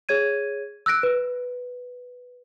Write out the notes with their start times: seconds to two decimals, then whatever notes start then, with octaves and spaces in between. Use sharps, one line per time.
0.09 G#4 C#5 G#6 D#7
0.86 E6 F#6 A#6 D7
1.03 B4